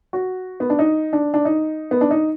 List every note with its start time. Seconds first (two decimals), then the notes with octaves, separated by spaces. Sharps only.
0.13 F#4
0.60 B3
0.70 D4
0.79 D#4
1.13 D4
1.34 D4
1.45 D#4
1.91 B3
2.01 D4
2.11 D#4